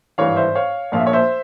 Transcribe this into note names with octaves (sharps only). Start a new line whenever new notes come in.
G#1 G2 E3 C#5 F5
C5 E5
C#5 F5
A#1 A#2 F3 F5
E5
C#5
C5 E5